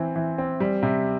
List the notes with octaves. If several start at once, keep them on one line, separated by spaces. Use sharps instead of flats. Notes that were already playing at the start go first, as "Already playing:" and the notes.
Already playing: E3 C4
E3
C4
G3
C3